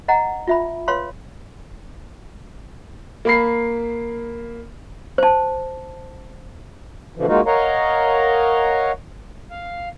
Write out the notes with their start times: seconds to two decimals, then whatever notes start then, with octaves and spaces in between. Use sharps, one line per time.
0.08 D#5 F#5 A#5
0.47 F4 E5 B5
0.88 B4 C#5 F5 B5 C6
3.25 A#3 B5 C7
5.18 C5 A5
7.15 F2 B2 D3 E3 F3
7.28 G#3 A#3 D#4 F4 F#4
7.46 A#4 C#5 D#5 F5 F#5 A#5
9.50 F5